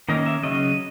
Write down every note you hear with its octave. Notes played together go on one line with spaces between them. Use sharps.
D#3 A#3 C#4 D#5
E5
C#3 F#3 C#4 D#5